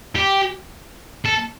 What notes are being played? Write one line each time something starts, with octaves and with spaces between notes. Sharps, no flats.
G4
A4